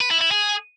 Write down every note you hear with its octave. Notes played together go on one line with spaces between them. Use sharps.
B4
E4
E4
G#4